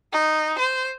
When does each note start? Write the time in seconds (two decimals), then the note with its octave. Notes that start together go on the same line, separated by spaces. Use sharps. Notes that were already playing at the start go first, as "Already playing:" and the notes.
0.13 D#4
0.59 C5